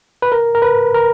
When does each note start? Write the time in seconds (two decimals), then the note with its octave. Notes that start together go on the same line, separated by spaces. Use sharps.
0.22 B4
0.32 A#4
0.55 A#4
0.62 B4
0.94 A#4